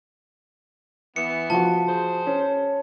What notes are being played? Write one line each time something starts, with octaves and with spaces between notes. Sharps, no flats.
E3 B3 C#7
F3 F#4 A5
G#4 C5
C#4